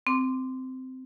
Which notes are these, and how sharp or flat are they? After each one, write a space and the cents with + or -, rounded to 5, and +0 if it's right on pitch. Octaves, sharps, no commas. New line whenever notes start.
C4 -15 D6 +0